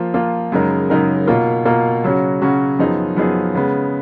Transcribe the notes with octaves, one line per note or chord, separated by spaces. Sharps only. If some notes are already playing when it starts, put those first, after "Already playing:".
Already playing: F3 A#3 F4
F3 A#3 F4
F#2 C#3 G#3 D#4 A#4
F#2 C#3 G#3 D#4 A#4
B2 A#3 F4 A#4
B2 A#3 F4 A#4
C#3 F#3 C#4 F#4
C#3 F#3 C#4 F#4
F#2 F3 B3 D#4 G#4
F#2 F3 B3 D#4 G#4
C#3 G#3 B3